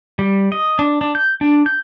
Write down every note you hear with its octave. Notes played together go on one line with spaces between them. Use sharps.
G3
D#5
D4
D4
G6
D4
G6